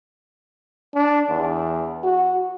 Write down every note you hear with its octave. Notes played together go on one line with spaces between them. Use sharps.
D4
E2
F#4